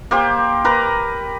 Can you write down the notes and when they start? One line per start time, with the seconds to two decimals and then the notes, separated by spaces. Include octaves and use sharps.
0.11 A#3 G4 C5
0.64 A#4 B4 A#5